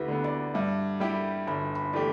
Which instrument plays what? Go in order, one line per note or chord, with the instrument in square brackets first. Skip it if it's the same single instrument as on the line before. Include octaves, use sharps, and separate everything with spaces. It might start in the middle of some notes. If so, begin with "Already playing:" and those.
Already playing: [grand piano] D2 [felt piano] E4 G4 B4
[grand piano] D3 B3
[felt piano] D5
[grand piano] G2 [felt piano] E5
[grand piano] G3 E4 G4 [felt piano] G5
[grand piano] G1 [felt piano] B5
[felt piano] B5
[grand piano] E3 A3 G4 [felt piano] D5